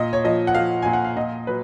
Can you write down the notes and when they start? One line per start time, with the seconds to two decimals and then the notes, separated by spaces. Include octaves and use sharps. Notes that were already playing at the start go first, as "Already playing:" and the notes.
Already playing: A#2 D#5
0.13 C#5
0.25 F3 D#5
0.47 F#5
0.55 F3 F5
0.82 A#2 G#5
0.93 F#5
1.05 F5
1.16 A#2 D#5
1.47 F#3 B4